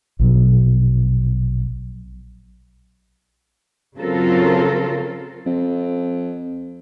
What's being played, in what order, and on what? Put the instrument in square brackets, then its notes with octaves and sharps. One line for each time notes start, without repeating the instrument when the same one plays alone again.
[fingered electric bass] A#1 B2 F#3
[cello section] C#3 F#3 C4 F4 A4 A#4
[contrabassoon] F2